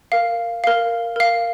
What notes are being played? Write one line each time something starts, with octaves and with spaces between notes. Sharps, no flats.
A#4 F5
A#4 F5
A#4 F5